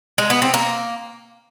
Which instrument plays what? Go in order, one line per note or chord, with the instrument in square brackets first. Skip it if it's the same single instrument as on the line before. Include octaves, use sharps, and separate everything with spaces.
[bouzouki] G#3
B3
C4
A#3